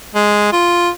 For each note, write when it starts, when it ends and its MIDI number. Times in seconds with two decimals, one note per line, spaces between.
0.15 0.50 56
0.52 0.89 65